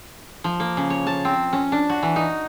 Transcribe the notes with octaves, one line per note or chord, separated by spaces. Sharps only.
F3
A#3
C#3
C#5
A5
C4
C#4
D4
F#4
E3
D#4